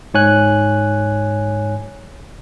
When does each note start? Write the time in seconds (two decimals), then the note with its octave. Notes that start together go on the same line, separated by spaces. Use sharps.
0.14 G#2 C#5 G#5 F#6